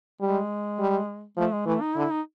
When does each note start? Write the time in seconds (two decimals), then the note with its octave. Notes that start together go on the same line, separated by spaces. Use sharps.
0.21 G3 G#3
0.79 G3
1.37 F3 A3
1.52 G#3
1.66 E3 A3
1.81 D#4
1.96 D3 E4
2.10 D#4